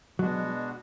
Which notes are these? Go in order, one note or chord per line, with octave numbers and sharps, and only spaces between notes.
B2 F#3 G#3 B3 D4 F#4